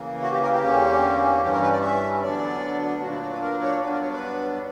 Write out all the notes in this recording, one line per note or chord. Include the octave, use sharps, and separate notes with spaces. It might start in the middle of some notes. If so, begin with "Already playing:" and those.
Already playing: C#3 E3 A#3
F#4
G4
A#4
G4
E2 D3 A#3 C#4
G2 E3 G3 C#4 G4
A#4
B4
D5
E5
D2 D3 F#3 B3 D4 D5
A#2 F#3 A#3 D4 F#4
E4
C#5
B4
A#4
C#5
G2 F#3 B3 D4 B4
A#4
C#5
B4